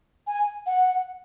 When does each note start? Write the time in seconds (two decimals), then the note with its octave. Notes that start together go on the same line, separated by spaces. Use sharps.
0.27 G#5
0.66 F#5